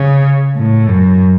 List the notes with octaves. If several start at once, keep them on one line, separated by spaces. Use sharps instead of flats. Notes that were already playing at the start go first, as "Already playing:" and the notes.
Already playing: C#3
A2
F#2